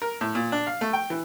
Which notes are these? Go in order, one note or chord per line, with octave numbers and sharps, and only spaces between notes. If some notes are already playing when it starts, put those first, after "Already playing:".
A#4
A2
A#2
D4
F5
A3
G5
E3